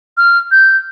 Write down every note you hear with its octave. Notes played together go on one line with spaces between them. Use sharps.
F6
G6